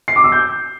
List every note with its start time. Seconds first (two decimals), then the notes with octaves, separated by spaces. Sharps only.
0.08 C7
0.16 D6
0.24 E6
0.32 G6